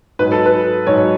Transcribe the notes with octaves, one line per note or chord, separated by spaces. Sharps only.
G#2 F#3 B4
A4
B4
G#2 F#3 C#5